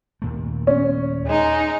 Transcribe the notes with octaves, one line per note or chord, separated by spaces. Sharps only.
D#2 A#2 A3
C#4
G#3 D#4